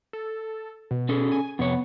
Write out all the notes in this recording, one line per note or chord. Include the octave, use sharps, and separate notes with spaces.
A4
B2
C#4 G#4 A4
G#5
F2 C3 B3 C#5